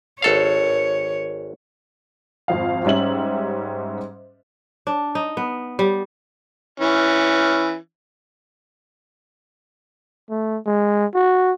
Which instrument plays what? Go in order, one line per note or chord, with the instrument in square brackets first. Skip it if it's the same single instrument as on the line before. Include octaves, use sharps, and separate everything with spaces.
[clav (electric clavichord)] G#1 A4 F5 [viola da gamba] C#5
[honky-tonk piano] G#1 F2 F5
G#2 G3 C#4 E5 F#7
[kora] D4
D#4
B3
G3
[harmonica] E3 C#4
[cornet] A3
G#3
F#4